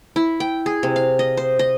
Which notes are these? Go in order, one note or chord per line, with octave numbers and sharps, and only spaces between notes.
E4
G5
G#4
C3
F5
D#5
C5
D#5